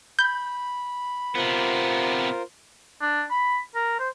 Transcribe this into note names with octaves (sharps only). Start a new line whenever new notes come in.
B5 G6
C3 B3 F4 A#4 C5
D4
B5
A#4
C5